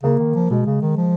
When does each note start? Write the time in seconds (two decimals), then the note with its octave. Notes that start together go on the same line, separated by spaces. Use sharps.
0.03 C#3 A#3
0.19 D#3
0.35 F3
0.50 B2 G#3
0.66 C#3
0.82 D#3
0.97 F3